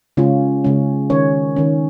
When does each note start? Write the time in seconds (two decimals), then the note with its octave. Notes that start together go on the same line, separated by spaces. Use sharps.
0.17 C#3 G#3 C#4 F4
0.64 C#3 G#3 C#4
1.10 D#3 C#4 C#5
1.56 D#3 C#4